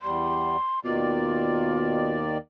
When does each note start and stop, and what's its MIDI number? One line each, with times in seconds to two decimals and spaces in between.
0.02 0.57 40
0.02 0.57 55
0.02 0.79 84
0.85 2.38 39
0.85 2.34 47
0.85 2.38 51
0.85 2.16 65
0.85 2.38 74